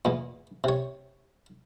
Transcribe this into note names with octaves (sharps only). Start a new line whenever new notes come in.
E2 A#2
C3 C#5